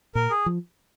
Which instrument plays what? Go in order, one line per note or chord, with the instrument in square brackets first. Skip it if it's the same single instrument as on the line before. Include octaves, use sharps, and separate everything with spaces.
[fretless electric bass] A#2 [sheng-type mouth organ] A#4
[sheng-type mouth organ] G#4
[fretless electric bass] F3